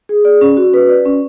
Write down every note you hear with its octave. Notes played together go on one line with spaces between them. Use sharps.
G#4
D5
C#4
F#4
B4
D5
C#4